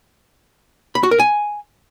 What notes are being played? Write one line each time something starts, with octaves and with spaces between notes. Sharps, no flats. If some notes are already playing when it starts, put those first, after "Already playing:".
B5
F#4
A#4
G#5